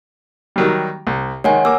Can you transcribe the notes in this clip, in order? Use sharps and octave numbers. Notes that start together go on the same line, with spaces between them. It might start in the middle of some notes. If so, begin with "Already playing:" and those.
D#3 F#3 G3
C2
D#3 G#3 C#5 F#5 G#5
A#3 D6 E6